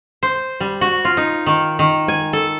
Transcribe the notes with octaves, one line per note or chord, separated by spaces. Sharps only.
C5
G3
F#4
F4
D#4
D#3
D#3
G#5
A4